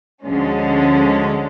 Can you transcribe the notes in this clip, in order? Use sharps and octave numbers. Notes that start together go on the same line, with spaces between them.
D2 D3 F3 G#3 C#4